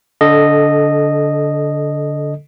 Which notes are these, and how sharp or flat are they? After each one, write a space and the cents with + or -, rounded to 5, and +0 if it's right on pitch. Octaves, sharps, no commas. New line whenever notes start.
D3 -20 A4 +0 D#5 -10